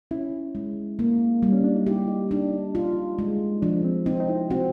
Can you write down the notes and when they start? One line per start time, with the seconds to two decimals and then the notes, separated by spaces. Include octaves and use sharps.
0.11 C#4 E4
0.55 G#3
0.99 A#3
1.43 G3
1.53 C#4
1.64 D4
1.75 D#4
1.86 E4 G4
2.08 D#4
2.31 D4
2.52 D#4
2.75 F4
3.19 G#3
3.62 F3 D4
3.85 C4
4.06 C4 D#4
4.20 D#4
4.29 E4
4.51 C4 F#4